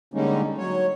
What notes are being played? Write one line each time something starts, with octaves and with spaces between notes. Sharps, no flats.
D3 G3 G#3 A#3 C#4 D#4
F#3 C#5